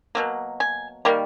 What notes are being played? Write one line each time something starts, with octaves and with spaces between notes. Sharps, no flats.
B2 F#3 A#3
G#5
D#3 G3 A#3